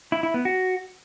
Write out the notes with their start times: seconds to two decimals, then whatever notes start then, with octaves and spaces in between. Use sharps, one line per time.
0.12 E4
0.23 E4
0.34 B3
0.45 F#4